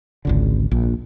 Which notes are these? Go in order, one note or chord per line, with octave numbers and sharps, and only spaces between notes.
G#1 C#2 D3
A#1